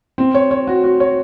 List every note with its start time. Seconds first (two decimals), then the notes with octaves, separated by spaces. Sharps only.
0.18 C4
0.34 C#5
0.51 C#5
0.67 F#4
0.84 F#4
1.00 C#5